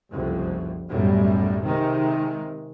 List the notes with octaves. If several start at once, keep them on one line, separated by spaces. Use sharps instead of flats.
F#1 C2 F2
B1 F#2 A2 G3
C3 D#3 G#3